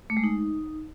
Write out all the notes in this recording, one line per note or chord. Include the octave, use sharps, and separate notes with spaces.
A3
G#3
D#4